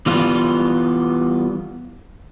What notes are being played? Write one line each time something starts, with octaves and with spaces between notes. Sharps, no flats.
E3 G3 B3 F4